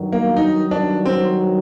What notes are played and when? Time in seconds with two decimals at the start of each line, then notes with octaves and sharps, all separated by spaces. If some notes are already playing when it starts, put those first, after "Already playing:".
Already playing: G2 D#3 F#3
0.12 A#3
0.36 D#4
0.71 D4
1.06 C4